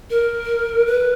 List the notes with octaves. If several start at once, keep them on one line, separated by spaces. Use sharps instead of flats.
A#4
B4